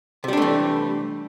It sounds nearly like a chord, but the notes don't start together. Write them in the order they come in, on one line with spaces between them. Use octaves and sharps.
C3 G3 D4 A3 E3